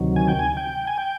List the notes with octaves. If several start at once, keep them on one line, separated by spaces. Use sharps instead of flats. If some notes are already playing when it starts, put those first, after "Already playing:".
Already playing: D2 C3 D#3 F#3
G#5
G5
G#5
G5
G#5
G5